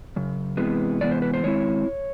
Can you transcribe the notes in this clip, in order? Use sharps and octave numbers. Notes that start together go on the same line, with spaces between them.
F#2 C#3
C3 E3 G#3 B3
C3 E3 G#3 B3 D5
C5
B4
C5
D#3 G#3 C4 E4 C#5